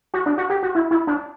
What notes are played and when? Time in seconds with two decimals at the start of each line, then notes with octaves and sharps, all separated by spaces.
0.14 F#4
0.26 D4
0.38 F#4
0.50 G4
0.63 F#4
0.75 E4
0.91 E4
1.07 D4